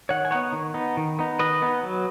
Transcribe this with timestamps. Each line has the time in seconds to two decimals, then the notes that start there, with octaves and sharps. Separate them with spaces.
0.09 D#3 C#5 F#5
0.25 G#5
0.31 B3 D#4 C#5 F#5
0.53 D#3
0.74 B3 D#4
0.97 D#3
1.19 B3 D#4
1.39 D#3 B4 D#5
1.62 B3 D#4
1.83 F#3